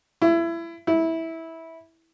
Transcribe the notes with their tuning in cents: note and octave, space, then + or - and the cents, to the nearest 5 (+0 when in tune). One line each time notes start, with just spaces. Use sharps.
E4 +25
E4 -15